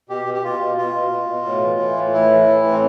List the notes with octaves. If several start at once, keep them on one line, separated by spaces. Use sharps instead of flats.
B2 G4
B2
G4
B2 F4
B2
B2 F4
B2
B2
B2
A2
E3
E3
A2
A2 E4
E3
E3
A2
C4